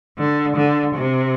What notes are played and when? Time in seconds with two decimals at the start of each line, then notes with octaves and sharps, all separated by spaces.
0.18 D3
0.56 D3
0.95 C3